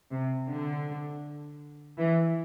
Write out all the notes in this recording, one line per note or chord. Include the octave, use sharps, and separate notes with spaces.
C3
D3
E3